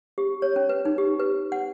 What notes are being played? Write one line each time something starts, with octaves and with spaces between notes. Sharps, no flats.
G4
C#5
C#4
B4
D#4
G4
B4
F#5